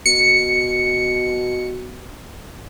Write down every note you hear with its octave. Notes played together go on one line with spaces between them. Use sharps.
B2 C#7